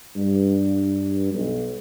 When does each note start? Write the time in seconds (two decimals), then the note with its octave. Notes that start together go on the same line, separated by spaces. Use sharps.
0.16 G2
1.33 B1